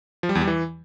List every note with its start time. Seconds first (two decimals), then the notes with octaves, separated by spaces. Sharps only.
0.23 F3
0.29 G3
0.35 E2
0.41 G3
0.47 E3